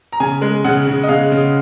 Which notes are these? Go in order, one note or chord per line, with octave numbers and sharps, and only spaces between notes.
A#5
C#3 G#5
G#3
C#3 F#5
C#3
D#5
C#3 F5
C#3